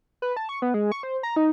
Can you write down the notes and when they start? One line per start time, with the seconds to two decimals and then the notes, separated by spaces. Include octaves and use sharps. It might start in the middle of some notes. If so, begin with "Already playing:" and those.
0.22 B4
0.37 A5
0.49 C#6
0.62 B3
0.74 G#3
0.92 C#6
1.03 C5
1.23 A#5
1.36 D#4